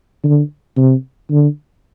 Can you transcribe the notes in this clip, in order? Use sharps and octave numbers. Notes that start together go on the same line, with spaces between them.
D3
C3
D3